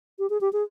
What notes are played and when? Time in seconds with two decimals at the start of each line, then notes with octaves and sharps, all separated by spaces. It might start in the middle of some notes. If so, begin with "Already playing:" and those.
0.19 G4
0.30 G#4
0.41 G4
0.53 G#4